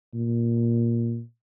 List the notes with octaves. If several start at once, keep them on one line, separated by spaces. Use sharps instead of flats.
A#2